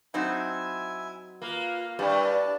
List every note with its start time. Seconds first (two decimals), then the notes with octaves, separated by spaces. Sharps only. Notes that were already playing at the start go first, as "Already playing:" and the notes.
0.14 F#3 C4 D#4 E4 E5 G#5
1.42 A#3 F4 B4 A#5
1.99 G2 D4 E4 G4 D5 A5